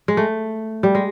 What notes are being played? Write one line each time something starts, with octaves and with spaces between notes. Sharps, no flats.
G#3
A3
G3
G#3